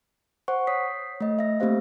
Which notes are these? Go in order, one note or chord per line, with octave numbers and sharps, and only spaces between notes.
C5 F#5 C#6
C#5 D#6 B6 C7
A3 D#5
E5 A#6
A3 A#3 C4 G4 C5 F5